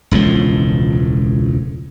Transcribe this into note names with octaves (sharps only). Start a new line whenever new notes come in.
E1 C#2 A2 F3